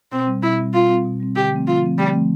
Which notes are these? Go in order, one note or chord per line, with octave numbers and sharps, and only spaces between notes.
B2 C4
G3 C4
B2 E4
G3 C4
B2 F4
G3 C4
B2
G3 C4
D3 G4
F3 A3 C4
D3 F4
F3 A3 C4
D3 G3
F3 A3 C4